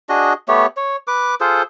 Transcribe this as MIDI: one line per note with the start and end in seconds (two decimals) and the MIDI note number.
0.09 0.33 62
0.09 0.33 66
0.09 0.33 68
0.09 0.33 75
0.48 0.66 57
0.48 0.66 59
0.48 0.66 67
0.48 0.66 73
0.77 0.96 73
1.07 1.35 71
1.07 1.35 86
1.40 1.62 65
1.40 1.62 68
1.40 1.62 69
1.40 1.62 72